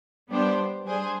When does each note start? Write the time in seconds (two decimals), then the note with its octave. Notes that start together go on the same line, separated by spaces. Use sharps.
0.30 G3 B3 D4 G4 C5
0.85 G3 D4 G#4 C5